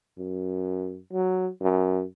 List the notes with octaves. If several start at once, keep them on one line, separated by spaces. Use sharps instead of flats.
F#2
F#3
F#2